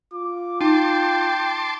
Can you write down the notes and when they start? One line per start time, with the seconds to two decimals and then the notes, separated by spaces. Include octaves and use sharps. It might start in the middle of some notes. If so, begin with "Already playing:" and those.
0.13 F4 D6
0.61 D#4 G5 A5 C6 D6